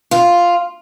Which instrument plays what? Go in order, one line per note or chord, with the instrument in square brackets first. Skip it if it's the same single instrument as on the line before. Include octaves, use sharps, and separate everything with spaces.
[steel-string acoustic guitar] F4